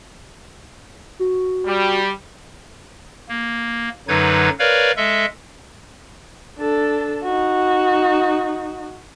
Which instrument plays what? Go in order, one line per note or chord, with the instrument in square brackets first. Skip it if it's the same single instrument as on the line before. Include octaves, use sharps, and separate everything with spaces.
[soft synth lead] F#4
[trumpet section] G3
[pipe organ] A#3
F#2 D3 F#3 D#4 B4 G#6
A#4 B4 C#5 D5 F5
G#3 A4 E5
[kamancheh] D4 A4
D#4 F#4